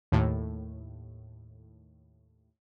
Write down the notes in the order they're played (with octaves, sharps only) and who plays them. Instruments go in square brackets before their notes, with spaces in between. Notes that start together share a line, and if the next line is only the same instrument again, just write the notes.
[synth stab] D#2 A2